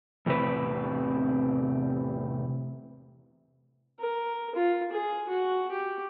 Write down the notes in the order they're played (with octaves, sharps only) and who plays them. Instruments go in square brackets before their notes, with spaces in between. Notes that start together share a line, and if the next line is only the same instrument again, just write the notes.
[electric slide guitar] E2 A2 C3 C4 B4
[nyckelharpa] A#4
F4
G#4
F#4
G4